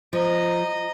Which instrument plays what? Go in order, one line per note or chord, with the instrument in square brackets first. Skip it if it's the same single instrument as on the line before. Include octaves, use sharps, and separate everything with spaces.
[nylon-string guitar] F3 [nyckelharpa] D#5 A#5